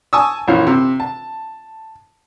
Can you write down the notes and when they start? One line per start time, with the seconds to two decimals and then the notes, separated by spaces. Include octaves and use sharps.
0.13 G#5 A5 C#6 D#6 E6
0.48 A#1 E3 C#4 F5
0.67 C3
1.00 A5